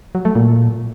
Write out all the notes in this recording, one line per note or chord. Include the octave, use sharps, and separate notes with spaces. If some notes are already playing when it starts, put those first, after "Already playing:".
F#3
A3
A#2